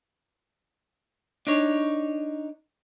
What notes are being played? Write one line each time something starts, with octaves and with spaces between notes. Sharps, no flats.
D4 D#4 C#5